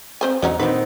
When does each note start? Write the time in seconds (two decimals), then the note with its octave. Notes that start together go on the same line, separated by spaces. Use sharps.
0.21 C4 C5 G#5
0.42 E2 F#3 C#4 D#4
0.59 A#2 D#3 B3 C4 D4 D#4 B4